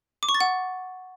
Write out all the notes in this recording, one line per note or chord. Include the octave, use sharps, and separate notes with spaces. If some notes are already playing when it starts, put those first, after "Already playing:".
D6
C#6
A6
F#5